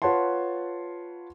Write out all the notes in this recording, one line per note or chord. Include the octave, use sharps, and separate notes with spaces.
F4 B4 C#5 F#5 A5 C6